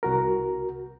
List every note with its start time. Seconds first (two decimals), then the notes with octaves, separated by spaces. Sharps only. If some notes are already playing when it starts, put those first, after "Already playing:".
0.03 C2 F#4 A#4